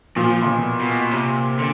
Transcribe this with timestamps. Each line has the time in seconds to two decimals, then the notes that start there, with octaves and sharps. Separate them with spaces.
0.16 A#2 F3
0.48 B2
0.80 B2
1.11 C3
1.58 D3